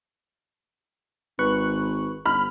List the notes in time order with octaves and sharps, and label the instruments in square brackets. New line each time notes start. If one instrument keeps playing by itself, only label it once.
[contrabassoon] G#1 [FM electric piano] B4 C#6 F#6
[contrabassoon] G1 [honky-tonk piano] B5 F6